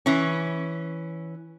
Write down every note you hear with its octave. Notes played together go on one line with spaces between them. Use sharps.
E3 C#4